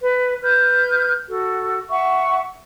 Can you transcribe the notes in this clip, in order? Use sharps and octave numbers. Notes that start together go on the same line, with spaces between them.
B4
B4 F6 G6
F#4 A4
E5 F#5 C#6